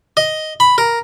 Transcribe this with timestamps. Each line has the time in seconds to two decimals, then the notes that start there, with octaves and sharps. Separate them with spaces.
0.17 D#5
0.60 B5
0.78 A#4